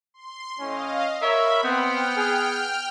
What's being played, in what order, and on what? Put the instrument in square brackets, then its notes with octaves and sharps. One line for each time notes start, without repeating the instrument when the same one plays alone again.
[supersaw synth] C6
[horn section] A2 C#4 [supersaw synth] D#5 F5
[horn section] A#4 C#5 [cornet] E5 [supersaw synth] B5
[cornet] B3 [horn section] C4 [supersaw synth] G5 F6
[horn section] G#4